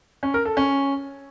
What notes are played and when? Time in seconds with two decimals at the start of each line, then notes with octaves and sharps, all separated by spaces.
0.23 C#4
0.34 A#4
0.45 A4
0.57 C#4